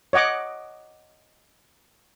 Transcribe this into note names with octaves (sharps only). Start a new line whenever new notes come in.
C#5 D#5 F#5 D6